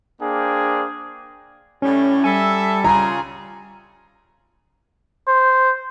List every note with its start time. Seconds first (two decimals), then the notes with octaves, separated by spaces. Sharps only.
0.22 A#3 D4 G#4 C5 G5
1.82 A2 G3 C#4
2.24 G3 A4 E5 G#5
2.84 C#3 F4 G#4 A#5
5.28 C5